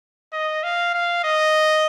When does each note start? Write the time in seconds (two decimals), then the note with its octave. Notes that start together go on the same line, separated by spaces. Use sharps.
0.33 D#5
0.63 F5
0.94 F5
1.24 D#5